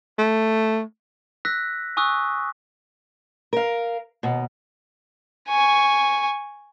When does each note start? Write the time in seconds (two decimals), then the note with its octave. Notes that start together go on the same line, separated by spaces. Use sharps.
0.18 A3
1.45 E6 F#6 A#6 B6
1.97 G#5 C#6 D#6 E6 F#6
3.53 A#4 F5
4.23 D#2 B2
5.48 G#5 C#6